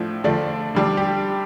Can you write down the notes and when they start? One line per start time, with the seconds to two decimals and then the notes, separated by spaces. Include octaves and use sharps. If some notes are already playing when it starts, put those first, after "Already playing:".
Already playing: A2 F3 A3 D4
0.24 D3 F3 A3 D4 D5
0.75 D3 G3 D4
0.97 G4